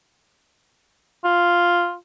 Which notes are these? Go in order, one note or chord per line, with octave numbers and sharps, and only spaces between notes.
F4